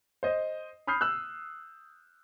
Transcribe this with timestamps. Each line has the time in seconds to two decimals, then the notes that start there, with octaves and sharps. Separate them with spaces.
0.23 C5 D#5
0.87 B5 D#6 F6 G6 C7
1.01 E6 F#6